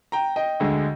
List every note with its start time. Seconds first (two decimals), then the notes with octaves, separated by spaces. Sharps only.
0.12 G5 A#5
0.36 D#5 G5
0.60 D2 D3 G#3